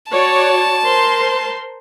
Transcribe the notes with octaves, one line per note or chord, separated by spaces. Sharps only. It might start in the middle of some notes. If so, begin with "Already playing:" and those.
F#4 C#5 D5 A5
A#4 C5 C6